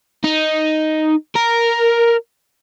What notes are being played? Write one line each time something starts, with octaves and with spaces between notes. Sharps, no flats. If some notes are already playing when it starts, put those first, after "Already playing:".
D#4
A#4